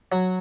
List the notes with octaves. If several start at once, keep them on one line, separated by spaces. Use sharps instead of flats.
F#3